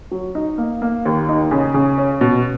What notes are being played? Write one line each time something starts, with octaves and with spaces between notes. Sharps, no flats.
F#3
D#4
A#3
A#3
D#2
D#4
C#3
C#3
C#4
B2